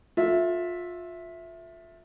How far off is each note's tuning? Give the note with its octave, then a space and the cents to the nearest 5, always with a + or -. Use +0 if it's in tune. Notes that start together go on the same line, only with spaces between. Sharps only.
F4 +25 A4 +0 E5 +0